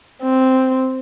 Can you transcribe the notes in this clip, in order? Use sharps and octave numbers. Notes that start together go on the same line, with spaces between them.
C4